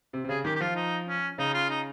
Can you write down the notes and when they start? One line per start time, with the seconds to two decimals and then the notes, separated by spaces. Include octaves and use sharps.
0.13 C3
0.24 C3
0.29 C#3 G#4
0.44 D#3 G4
0.55 G4
0.60 F3 F4
0.75 D#4
1.06 C#4
1.38 C#3 D#4
1.54 F4
1.70 D#4